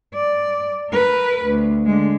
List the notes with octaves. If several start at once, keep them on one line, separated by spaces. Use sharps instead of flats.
D5
A#4 B4
D2
D3 G#3